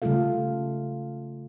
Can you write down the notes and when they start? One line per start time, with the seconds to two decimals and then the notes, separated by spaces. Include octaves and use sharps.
0.02 C#3 G3 A3 F4 A4 F5